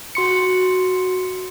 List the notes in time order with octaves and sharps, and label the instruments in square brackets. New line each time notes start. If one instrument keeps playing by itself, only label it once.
[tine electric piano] F#4 C6 C#7